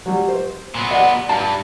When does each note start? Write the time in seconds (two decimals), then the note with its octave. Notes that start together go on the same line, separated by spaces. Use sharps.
0.06 F#3 G3
0.28 C5
0.75 A#2 B3
0.91 D5 F#5
1.29 G2 A5